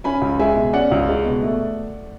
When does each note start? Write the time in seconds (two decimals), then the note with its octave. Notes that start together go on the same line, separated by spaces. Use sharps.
0.04 C#4 G#5 B5
0.22 C#2
0.39 G#3 E5 G#5
0.56 B2
0.73 C#4 D5 F#5
0.91 C#2
1.09 G#3
1.25 B2
1.42 A3